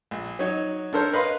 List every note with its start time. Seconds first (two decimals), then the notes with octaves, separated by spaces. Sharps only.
0.11 A#1
0.39 F#3 D#4 C#5
0.93 D4 A4 A#4 C5 C#5
1.13 A#4 B4 D#5 F5 B5 C6